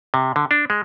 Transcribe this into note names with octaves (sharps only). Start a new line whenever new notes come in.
C3
D3
D4
G#3